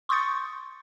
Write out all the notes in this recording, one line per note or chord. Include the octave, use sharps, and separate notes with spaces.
C6 C#6 D#6 G6 A6 C#7